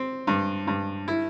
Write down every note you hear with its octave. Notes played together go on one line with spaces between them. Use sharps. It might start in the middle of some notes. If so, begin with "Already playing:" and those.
Already playing: C4
G2
G2
E4